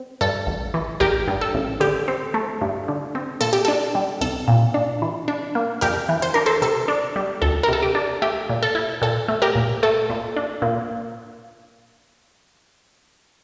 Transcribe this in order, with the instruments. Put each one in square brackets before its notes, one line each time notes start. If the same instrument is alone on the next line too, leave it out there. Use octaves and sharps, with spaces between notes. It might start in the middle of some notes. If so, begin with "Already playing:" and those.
Already playing: [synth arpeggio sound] C4
G2 A4
A1
E3
A1 G4 A#4
G2
A4
A1
D3 G4
C4
A3
G2
D3
C4
A#2 A4
G4
D4 A4
G3
C2 A4
A#2
D4
E3
D4
A#3
F2 G4 A#4
E3
C5
D4 A#4
A4 C5
C3 A4
D4
G3
D2 A4
A#4
C3 A4
G4
D4
A3 G4
A#2
A4
E4
A#2 A4
A3
G4 A#4
A#2
A3 A4
A#2
D4
A#2